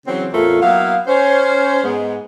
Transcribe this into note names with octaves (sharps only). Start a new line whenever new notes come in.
C#3 E3 F#3 C4
E2 A2 A3 C4 F4 A#4
F#3 A#3 B3 E4 F5
C#4 C5
G#2 G#3 B3